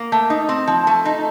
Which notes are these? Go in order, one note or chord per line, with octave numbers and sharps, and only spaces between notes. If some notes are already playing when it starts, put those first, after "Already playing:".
Already playing: A#3
A3
D#4
C4
F3
A3
D#4